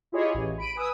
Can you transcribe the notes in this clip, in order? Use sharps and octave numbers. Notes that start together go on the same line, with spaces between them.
E4 F4 G4 G#4 C#5 D#5
A1
B5 D7 D#7
B4 G#5 D#6 E6